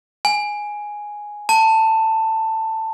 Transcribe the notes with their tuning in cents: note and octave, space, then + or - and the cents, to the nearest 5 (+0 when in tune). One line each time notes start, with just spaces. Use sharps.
G#5 +0
A5 +15